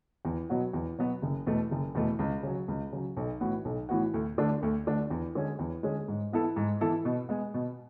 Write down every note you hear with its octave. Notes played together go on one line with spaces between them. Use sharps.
E2
B2 F#3 B3 F#4
E2
B2 F#3 B3 F#4
F#1
E2 B2 A3
F#1
E2 B2 A3
C#2
C#3 F#3
C#2
C#3 F#3
B1
A2 E3 B3 F#4
B1
A2 E3 B3 F#4
D2
D3 A3 D4
D2
D3 A3 D4
E2
D3 G#3 C#4 G#4
E2
D3 G#3 C#4 G#4
G#2
E3 B3 E4 A4
G#2
E3 B3 E4 A4
B2
G#3 B3
B2